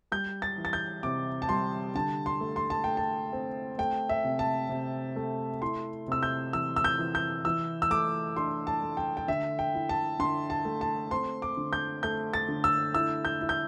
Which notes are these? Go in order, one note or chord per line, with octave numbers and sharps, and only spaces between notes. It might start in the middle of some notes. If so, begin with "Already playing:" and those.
G3 G6
A6
E3
A6
G6
C3 D6
A5
G3 C6
D3 A5
C6
A3
C6
A5
A3 G5
A5
C4
A3 G5
E5
C3
A5
C3
A3
E4 C6
C3 E6
G6
E3 E6
E6
G6
E3
G6
E3 E6
E6
A3 D6
D4 C6
A5
A3
G5
G5
D3 E5
G5
E4
A5
D3 C6
A5
A3
A5
C4 C6
D6
D3
G6
A3 G6
A6
D3
E6
E4 E6
G6
E4
G6